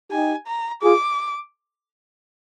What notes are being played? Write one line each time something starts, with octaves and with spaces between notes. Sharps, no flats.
D#4 G4 G#5
A#5
F4 G#4 D6